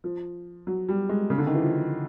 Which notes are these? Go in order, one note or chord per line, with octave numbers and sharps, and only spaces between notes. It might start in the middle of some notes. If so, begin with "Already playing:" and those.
F3
F#3
G3
G#3
C#3
D3
D#3
E3
F3